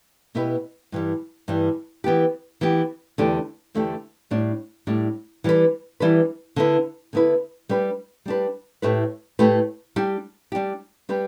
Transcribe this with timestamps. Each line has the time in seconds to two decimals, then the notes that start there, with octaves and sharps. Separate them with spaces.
0.35 B2 B3 E4 G4 B4
0.92 G2 E3 G3
1.48 G2 E3 G3
2.04 E3 B3 G4
2.61 E3 B3 G4
3.18 E2 D3 A3 D4 G4
3.74 E2 D3 A3 D4 G4
4.31 A2 G3 D4
4.87 A2 G3 D4
5.44 E3 G3 D4 B4
6.00 E3 G3 D4 B4
6.56 D3 B3 E4 B4
7.13 D3 B3 E4 B4
7.69 G3 D4 G4 B4
8.26 G3 D4 G4 B4
8.82 A2 A3 E4 G4 B4
9.39 A2 A3 E4 G4 B4
9.96 G3 D4 G4
10.52 G3 D4 G4
11.09 G3 D4 G4 B4